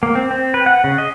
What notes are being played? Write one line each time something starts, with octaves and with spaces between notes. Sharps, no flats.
A#3
C4
C4
B4
F#5
C#3
D#5